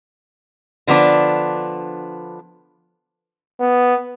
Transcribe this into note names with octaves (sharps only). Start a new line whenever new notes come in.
D3 F3 B3 D4
B3